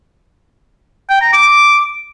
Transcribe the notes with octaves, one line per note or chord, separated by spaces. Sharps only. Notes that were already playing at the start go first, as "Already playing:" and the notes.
G5
A#5
D6